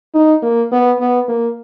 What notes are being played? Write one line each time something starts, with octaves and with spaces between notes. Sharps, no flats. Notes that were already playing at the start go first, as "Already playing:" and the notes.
D#4
A#3
B3
B3
A#3